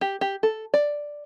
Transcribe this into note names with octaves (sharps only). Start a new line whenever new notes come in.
G4
G4
A4
D5